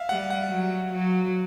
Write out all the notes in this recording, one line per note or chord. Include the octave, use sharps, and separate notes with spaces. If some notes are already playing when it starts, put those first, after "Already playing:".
Already playing: E5 F5
G3 F#5
F#5
F#3
F#3